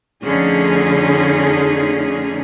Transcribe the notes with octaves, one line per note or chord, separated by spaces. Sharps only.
F2 D3 A3 C#4 D#4 G#4